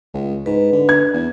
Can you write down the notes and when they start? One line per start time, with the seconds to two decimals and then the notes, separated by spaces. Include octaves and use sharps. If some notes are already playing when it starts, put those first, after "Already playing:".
0.14 C#2
0.46 G#2 B4
0.73 D3
0.89 G#6
1.13 E2